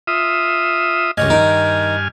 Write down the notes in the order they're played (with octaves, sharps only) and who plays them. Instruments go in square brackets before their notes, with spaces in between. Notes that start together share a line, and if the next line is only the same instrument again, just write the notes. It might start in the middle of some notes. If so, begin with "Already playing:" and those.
[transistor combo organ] F4 E5 D#6
[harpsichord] C#2 C#5 D#5 [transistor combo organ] G2 G#5 F6
[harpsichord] D#3 D#4 A#4